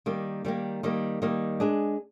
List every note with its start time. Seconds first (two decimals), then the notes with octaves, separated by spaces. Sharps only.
0.06 D#3 G3 A#3
0.45 D#3 G3 A#3
0.83 D#3 G3 A#3
1.22 D#3 G3 A#3
1.60 G#3 D4 G#4